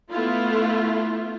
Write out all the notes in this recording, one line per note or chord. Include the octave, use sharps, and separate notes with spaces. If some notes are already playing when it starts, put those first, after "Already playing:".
A3 B3 E4 F4